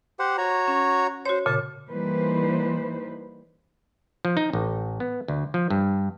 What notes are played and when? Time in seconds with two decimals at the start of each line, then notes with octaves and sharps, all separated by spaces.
0.19 G4 C5 F#5
0.38 F#4 C#5 A#5
0.68 C#4
1.25 F#4 C5 C#5
1.46 A#2 C#3 A5
1.89 E3 G3 A#3 D#4 B4 C5
4.25 F3
4.37 D#4
4.53 A1
5.00 B3
5.28 D2
5.54 F3
5.70 G2